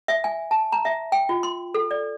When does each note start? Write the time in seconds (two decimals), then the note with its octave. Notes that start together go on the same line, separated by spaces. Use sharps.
0.08 E5
0.24 G#5
0.51 A5
0.72 A#5
0.85 E5
1.12 G5
1.29 F4
1.43 C6
1.74 A4
1.91 D5